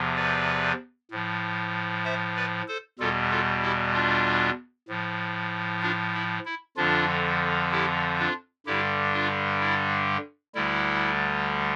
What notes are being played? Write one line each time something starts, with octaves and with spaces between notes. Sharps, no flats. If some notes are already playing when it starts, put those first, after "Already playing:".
Already playing: E2 C3 F3
B4 D5
A2 F3
C5 E5
B4 D5
A4 C5
E2 B2 G3 F4 A4
F4 A4
E4 G4
D4 F4
A2 F3
D4 F4
E4
E4
F2 D3 F3 D4 F4
E4 G4
D4 F4
G2 D3 G3 E4 G4
D4 F4
E4
D2 D3 G3 E4